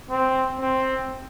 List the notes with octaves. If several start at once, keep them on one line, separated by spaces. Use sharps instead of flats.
C4
C4